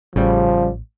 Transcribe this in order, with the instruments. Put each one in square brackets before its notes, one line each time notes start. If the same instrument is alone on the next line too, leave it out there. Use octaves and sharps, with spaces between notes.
[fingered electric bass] A1 [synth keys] C#3 G3 [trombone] F3